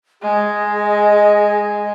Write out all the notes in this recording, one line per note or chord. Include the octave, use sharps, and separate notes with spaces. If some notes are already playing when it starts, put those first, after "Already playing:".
G#3 G#4 D#5